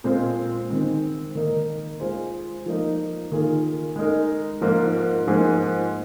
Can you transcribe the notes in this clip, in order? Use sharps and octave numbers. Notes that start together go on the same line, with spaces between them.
A#2 G#3 C4 F4 C5
D#3 G#3 C4
D#3 A#3 D#4 A#4
G#3 F4 G#4 C5
F3 A#3 D#4
D#3 A#3 F4 G#4
G#3 D#4 A#4
G#2 F3 A#3 F4 A#4
G#2 F3 A#3 G#4